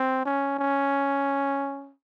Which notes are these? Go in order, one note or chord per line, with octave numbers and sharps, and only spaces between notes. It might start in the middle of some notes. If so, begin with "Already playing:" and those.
Already playing: C4
C#4
C#4